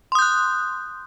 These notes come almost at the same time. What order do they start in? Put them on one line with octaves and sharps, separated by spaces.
C6 D#6 G6 F#6